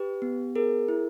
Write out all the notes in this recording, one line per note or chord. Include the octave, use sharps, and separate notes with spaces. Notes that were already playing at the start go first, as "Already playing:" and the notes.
Already playing: G4 B4
B3
G#4 A#4
E4